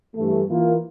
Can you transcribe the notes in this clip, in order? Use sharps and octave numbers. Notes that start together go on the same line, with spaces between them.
G2 E3 A3
E3 A#3 F4